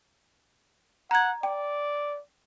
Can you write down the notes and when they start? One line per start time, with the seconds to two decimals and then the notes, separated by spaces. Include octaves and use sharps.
1.11 F#5 A#5 G#6
1.43 D5 G5